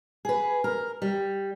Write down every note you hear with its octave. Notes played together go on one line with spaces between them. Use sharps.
G#4 B4
A#4
G3